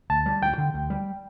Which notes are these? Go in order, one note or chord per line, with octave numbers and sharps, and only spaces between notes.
D2 A5
G3
D2 G5
D3
D2
G3